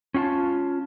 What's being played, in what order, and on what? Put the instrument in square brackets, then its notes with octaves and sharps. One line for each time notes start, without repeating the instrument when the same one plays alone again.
[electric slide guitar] C#4 F4 F#5 A5